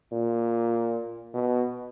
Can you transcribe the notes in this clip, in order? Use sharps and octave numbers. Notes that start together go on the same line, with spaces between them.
A#2
B2